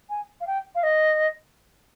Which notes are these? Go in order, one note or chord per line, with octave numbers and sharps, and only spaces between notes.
G#5
F5
G5
F5
D#5